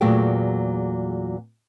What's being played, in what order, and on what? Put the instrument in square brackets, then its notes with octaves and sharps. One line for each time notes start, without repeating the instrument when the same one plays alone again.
[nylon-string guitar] E2 A#2 F#3 A3 G#4 G5